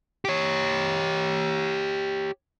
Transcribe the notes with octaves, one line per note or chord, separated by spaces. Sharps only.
G4 C#5